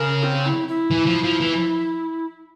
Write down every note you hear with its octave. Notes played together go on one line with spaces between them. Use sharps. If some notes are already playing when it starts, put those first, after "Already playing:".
Already playing: C#3 A#4
C4
E4
E4
E3
F3
F3
E3